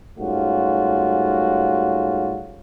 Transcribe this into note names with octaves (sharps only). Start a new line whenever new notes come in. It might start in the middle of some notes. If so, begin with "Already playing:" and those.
G#2 G3 A3 C#4 F4 F#4